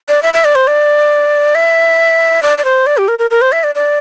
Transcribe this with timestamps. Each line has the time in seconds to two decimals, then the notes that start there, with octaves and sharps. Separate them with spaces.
0.09 D5
0.23 E5
0.34 E5
0.45 D5
0.55 C5
0.67 D5
1.55 E5
2.43 D5
2.58 D5
2.65 C5
2.86 D5
2.98 G4
3.08 A#4
3.19 A#4
3.31 A#4
3.41 C5
3.52 E5
3.64 D5
3.75 D5